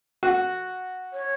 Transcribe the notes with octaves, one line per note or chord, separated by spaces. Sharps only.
F#4
C#5